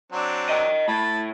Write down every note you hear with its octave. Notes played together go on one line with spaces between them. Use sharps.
F#3 C4 D4
D#5 G5
A2 A5 B5